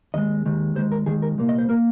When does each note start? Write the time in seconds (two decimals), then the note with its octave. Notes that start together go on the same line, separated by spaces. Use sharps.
0.14 D#2 D#3 G#3 D#5
0.45 D#2 D#3 G#3
0.76 D#2 D#3 G#3 C5
0.92 A#4
1.06 D#2 D#3 G#3 G#4
1.22 A#4
1.38 C2 A#2 A#3
1.49 D#5
1.58 C5
1.69 A#2 A#3 A#4